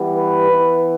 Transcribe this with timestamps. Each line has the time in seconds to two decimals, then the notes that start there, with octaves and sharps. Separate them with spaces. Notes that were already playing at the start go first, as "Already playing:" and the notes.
Already playing: E3 G3 B3
0.14 B4
0.50 E3 B3